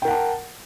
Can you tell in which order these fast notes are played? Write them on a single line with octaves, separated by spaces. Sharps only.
G5 A#4 F#5 A5